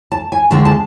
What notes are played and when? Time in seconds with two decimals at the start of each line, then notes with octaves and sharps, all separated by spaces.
0.12 A5
0.32 G#5
0.50 D2 D3 G#3 C4 A5
0.65 A5